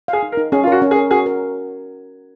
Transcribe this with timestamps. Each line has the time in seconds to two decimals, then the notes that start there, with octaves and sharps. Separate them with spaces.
0.08 G#4 F5
0.22 D#4
0.32 A#4
0.37 D#4
0.52 C#4 G#4
0.63 F4
0.67 F#4 A#4
0.82 C#4
0.91 G#4
0.96 A#4
1.11 F#4 G#4
1.26 A#4